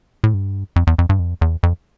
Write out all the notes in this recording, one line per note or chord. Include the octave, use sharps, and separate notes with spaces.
A2
G2
F2
E2
F2
G2
F2
E2
F2